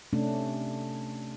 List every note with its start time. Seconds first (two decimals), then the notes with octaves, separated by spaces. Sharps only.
0.13 C3 A3 C#4 D4